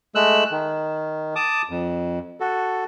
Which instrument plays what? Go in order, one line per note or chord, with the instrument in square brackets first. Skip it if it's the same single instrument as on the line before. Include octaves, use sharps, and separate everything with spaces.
[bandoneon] G#3 A3 E6 F#6
D#3
A5 D6 D#6
F2
F#4 A4